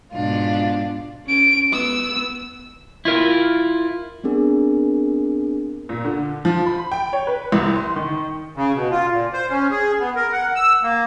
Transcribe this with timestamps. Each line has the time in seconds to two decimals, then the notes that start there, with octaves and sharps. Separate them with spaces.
0.12 G#2 B2 D4 F4
1.27 C#4 D7
1.71 B3 E6
3.05 E4 F4 A#4
4.24 B3 C4 D4 G#4 A#4
5.89 A#2
6.05 D3
6.45 F3
6.66 B5
6.92 G5
7.13 C#5
7.27 B4
7.52 C2
7.76 C6
7.96 D#3
8.56 C#3
8.75 B2
8.91 F4
9.11 A#2
9.33 C5
9.50 C#4
9.71 G#4
10.00 B3
10.16 A#4
10.32 F#5
10.56 E6
10.83 A#3